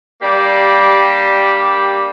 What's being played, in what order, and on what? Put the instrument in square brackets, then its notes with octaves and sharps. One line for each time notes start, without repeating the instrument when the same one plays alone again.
[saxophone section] G3 A#3 D4 G4 D5